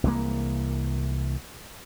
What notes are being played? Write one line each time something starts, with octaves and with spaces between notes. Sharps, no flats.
C2 E3 G#3 A#3